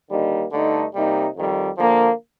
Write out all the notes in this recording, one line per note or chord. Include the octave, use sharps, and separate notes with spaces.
D#2 D3 G3 A#3 D#4
G2 D3 A3 D#4
C3 G3 A#3 D#4
F2 D#3 G3
D3 F3 A#3